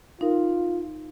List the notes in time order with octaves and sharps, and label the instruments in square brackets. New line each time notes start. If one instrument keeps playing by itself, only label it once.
[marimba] D#4 A#4 [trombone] F4